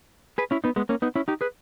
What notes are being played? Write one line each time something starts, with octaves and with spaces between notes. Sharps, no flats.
G#4 B4
C#4 E4
B3 D#4
G#3 B3
A#3 C#4
B3 D#4
C#4 E4
D#4 G4
G#4 B4